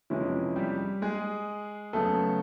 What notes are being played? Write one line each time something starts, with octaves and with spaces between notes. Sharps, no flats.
F2 C3 E3 F3 G#3 C#4 E4
G3 G4
G#3 G#4
F#2 C#3 F#3 A3 B3 A4